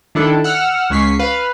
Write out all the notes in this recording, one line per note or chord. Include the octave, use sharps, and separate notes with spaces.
D#3 D4 E4 A4
F#5 E6 F6
C#2 C#4 C#6 B6 C7
B4 F5